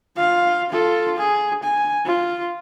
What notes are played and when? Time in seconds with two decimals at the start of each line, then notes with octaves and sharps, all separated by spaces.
0.16 F4 F5
0.70 F4 A4
1.17 G#4
1.63 G#5
2.05 F4